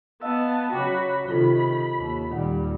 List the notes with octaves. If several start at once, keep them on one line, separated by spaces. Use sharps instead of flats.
B3 D#5 F5 A5 E6
C#3 F#3 F#4 G5 B5 D6
C3 D#3 F4 A4 B5
D#2
D#2 A#2 D#3 G3 F#5